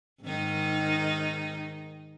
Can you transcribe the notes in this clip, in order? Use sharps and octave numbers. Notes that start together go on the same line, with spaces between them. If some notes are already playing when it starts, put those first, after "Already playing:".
G#2 D#3 D#4